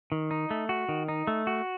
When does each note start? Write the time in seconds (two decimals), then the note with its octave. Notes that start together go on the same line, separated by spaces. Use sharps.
0.12 D#3
0.31 D#4
0.51 A3
0.69 F#4
0.89 D#3
1.08 D#4
1.27 A3
1.47 F#4